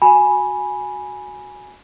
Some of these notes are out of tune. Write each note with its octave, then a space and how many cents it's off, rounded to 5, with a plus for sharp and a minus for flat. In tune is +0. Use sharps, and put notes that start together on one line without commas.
F#4 +0 G#5 +0 B5 -20